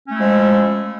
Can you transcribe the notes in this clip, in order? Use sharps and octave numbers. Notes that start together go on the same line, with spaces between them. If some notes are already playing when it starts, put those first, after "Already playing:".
F3 G#3 A3 C#4 E4